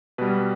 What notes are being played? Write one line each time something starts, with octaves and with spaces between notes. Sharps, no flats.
B2 G3 B4